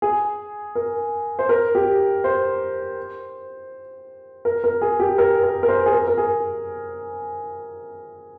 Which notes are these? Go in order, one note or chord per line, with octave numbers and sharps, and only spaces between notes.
G#4
A#4
C5
A#4
G4
C5
A#4
A#4
G#4
G4
A#4
A#4
A#4
C5
G#4
A#4
A#4
G#4